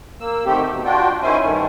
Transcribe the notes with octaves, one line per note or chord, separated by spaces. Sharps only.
A#3 E6
D3 D#3 A3 C4 G4
B2
D4 F4 F#4 G5
D#3 C#4 E4 C5 G#5
G2 D#3 A3